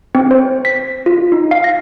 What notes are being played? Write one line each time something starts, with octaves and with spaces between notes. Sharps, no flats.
C4
C5
B6
F4
D#4
F5
A#6